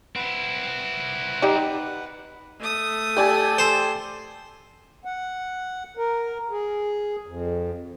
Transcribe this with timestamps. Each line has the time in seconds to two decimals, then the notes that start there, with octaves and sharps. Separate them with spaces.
0.16 C4 E4 B4 F#5
1.42 D#4 G4 D5
2.59 A3 D#6
3.17 G4 A4 D5 G#5
3.58 C5
5.05 F#5
5.97 A#4
6.50 G#4
7.27 F2